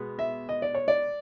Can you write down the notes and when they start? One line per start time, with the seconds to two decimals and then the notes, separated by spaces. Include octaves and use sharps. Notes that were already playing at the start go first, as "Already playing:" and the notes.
Already playing: B2 G#3 B3
0.19 E5
0.49 D#5
0.62 D5
0.75 C#5
0.88 D5